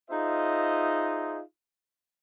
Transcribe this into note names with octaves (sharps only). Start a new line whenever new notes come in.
D#4 F4 G#4 C5 D#5 E5